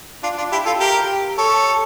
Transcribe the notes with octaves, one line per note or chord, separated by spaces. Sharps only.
D4 F4
D4 F4
E4 G4
F4 A4
G4 A#4
A4 C#5